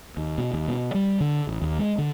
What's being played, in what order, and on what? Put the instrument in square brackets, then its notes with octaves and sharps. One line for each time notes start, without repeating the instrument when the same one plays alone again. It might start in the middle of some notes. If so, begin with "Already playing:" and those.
[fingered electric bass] D#2
B2
D#2
B2
G3
D3
A1
D#2
G#3
D3